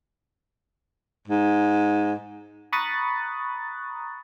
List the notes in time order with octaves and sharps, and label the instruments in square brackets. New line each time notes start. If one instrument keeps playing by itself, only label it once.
[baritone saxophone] G#2
[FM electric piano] A#5 B5 C#6 D#6 F#6 A6